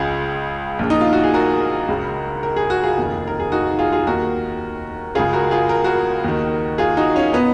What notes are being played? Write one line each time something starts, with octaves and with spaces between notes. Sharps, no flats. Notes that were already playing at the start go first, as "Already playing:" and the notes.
Already playing: C#2 C#3 F4 G#4
A#1 A#2
D#4
F4
F#4
G#4
F#4 A#4
C#2 C#3
A#4
G#4
F#4
F4 G#4
F1 D#2 D#3
A#4
G#4
D#4 F#4
F4 G#4
F4 G#4
D#2 D#3 F#4 A#4
C#2 C#3 F4 G#4
F#4 A#4
F4 G#4
A#4
F#4 A#4
D#2 D#3
F4 G#4
D#4 F#4
C#4 F4
B2 B3 D#4